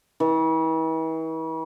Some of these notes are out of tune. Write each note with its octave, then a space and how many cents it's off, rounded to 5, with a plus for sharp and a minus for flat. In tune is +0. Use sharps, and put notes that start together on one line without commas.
E3 -40